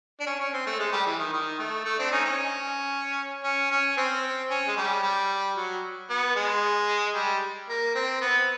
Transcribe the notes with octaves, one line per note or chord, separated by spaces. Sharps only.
D4
C#4
C#4
C4
A3
G#3
G3
E3
D#3
D#3
A3
A3
C4 D4
C#4 D#4
C#4
C#4
C#4
C4
C#4
G#3
G3
G3
F#3
B3
G#3
G3
A#3
C4
B3